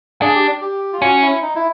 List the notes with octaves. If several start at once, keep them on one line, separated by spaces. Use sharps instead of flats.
D4 G#4
G4
G4
F4
C#4 F#4
E4
D#4
E4